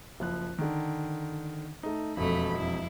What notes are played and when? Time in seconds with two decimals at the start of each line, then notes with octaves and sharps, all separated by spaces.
0.20 F#1 F3 F#6
0.59 D3 D#3
1.83 A3 D#4
2.17 E1 F2 A3 B5
2.57 F2 E4